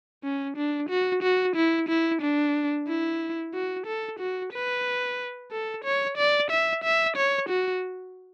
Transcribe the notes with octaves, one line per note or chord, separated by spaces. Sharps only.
C#4
D4
F#4
F#4
E4
E4
D4
E4
F#4
A4
F#4
B4
A4
C#5
D5
E5
E5
C#5
F#4